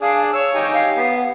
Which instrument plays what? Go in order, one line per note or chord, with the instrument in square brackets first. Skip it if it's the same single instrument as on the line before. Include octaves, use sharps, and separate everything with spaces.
[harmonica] D4 G#4 D5 [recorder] F5
[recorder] C#5 [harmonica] E6
[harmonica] D#4 G4 G#5
[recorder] F5
[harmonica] B3